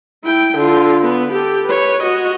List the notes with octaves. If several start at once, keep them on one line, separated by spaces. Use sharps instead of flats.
E4 G5
D3 F4
B3
G4 A4
B4 C#5
F#4 D#5